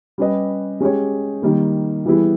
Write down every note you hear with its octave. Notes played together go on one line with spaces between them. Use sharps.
G3 C#4 G4 B4 D#5
G#3 C#4 G4 C#5
D#3 G3 A#3
E3 G3 B3 E4 G#4